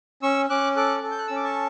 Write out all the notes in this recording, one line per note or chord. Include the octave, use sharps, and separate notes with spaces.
C#4 C#6 E6
C#4 D6 F#6
A4 D6 F#6
A4
G6
F#6
C#4 E6
D6
A5 C#6